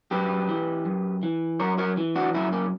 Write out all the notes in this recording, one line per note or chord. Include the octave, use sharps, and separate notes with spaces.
F#2 G4 B4
E3
F#2
E3
F#2 A#4 C#5
A#4 C#5
E3
D4 F#4
F#2 C#4 E4
A#3 C#4